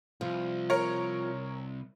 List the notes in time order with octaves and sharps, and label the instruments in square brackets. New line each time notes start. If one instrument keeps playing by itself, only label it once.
[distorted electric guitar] C2 [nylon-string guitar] F3
[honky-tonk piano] A#4 C#5